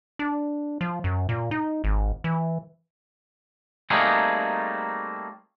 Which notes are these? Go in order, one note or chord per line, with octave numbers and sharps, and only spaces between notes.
D4
F3
F#2
A#2
D#4
G#1
E3
G3 A3 A#3 C4 D#4 G#4